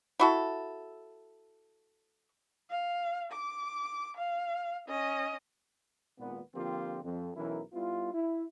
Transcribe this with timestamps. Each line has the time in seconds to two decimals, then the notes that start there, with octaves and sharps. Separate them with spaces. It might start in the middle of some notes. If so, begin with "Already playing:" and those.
0.19 E4 F#4 A4
2.70 F5
3.32 D6
4.17 F5
4.88 C#4 D#5
6.19 G#1 A#2 B3
6.54 D3 F3 A#3 C4 F4 G4
7.04 F2
7.36 B1 E3 C#4 E4 A#4
7.74 G3 B3 E4 F4
8.13 E4